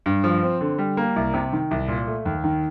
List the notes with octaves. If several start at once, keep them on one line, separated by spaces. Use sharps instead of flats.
G2
F3
C4
D3
G3
A#3
C2
C3
D#3
C2
A#2
A3
D#2
D#3